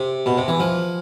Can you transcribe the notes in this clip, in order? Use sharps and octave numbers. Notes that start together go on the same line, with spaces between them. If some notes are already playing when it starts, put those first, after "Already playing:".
Already playing: C3
B2
C3
E3
F3